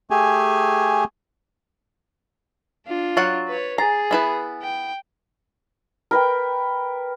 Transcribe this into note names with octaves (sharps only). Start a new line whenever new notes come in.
A3 G4 G#4 G#5
D4 F4
F#3 F5 F#5 A6
B4 C#5
G#4 G#5 A#5 A6 C7
B3 E4 B4
G5
A#4 B4 G5